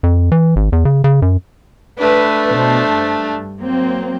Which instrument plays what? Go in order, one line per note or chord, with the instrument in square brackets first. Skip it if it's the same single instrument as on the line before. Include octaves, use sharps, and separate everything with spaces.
[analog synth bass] F2
E3
G#1
E2
C#3
C#3
F#2
[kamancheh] A3 D4 [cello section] B4
[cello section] B2 C5
G2
F#3 A#3 C4